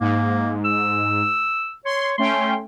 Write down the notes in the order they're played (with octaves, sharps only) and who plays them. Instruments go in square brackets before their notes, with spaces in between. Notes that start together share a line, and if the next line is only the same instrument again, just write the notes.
[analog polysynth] G#2 [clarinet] A#3
[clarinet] E6
[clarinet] C#5 [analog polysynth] C6
[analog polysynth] A3 C#4 G5 [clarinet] C6